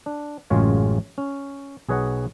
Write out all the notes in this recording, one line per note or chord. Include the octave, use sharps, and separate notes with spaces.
D4
A1 F#2 C#3 G#3 F4 C#5
C#4
B1 G#4 B4 C#5 D#5 F#5